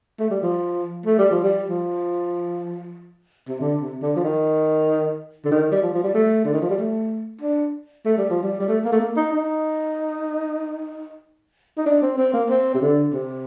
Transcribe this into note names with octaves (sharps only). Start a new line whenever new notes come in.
A3
G3
F3
A3
G3
F3
G3
F3
C3
D3
C3
D3
F3
D#3
D3
D#3
G3
F3
F3
G3
A3
D3
D#3
F3
G3
A3
D4
A3
G3
F3
G3
G3
A3
A#3
A3
A#3
D#4
D#4
D#4
D4
C4
C4
A#3
C4
C3
D3
C3